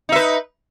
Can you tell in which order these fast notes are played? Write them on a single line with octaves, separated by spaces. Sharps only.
D#4 E5 B4